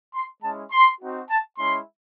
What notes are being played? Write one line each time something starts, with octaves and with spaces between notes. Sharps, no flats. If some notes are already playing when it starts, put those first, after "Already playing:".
C6
G#3 C#4 E4 A5
C6
C4 D#4 F#4
A5
G#3 C#4 E4 C6